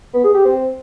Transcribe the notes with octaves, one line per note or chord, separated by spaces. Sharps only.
B3
G#4
G4
C4